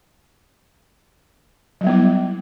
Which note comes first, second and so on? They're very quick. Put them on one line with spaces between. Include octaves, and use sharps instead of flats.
F#3 G3 B3 E4